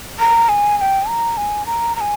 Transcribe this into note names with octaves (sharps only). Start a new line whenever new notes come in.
A#5
G#5
G#5
G5
A#5
G#5
A#5
A#5
G#5